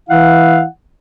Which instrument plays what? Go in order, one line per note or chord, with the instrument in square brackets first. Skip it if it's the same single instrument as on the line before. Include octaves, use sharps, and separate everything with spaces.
[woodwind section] E3 E4 F5 F#5